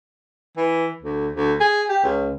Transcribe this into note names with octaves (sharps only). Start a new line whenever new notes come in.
E3
D2
D2
G#4
G4
C#2